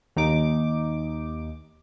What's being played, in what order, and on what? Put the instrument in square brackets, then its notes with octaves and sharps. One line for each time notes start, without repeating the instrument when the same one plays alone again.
[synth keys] D#2 D#4 D6